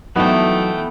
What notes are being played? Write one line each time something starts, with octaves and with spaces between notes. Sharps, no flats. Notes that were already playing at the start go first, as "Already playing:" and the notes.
E3 F#3 A3 B3 D4 D#4 G5